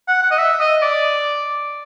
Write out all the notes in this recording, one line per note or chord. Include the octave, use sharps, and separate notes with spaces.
F#5
F#5
D#5
E5
D#5
D5